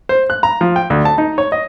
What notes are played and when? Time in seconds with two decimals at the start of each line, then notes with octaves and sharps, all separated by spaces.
0.09 C5
0.30 F#6
0.43 A#5
0.61 F3
0.76 G5
0.90 D2
1.05 A5
1.18 D#4
1.38 C#5
1.52 D#5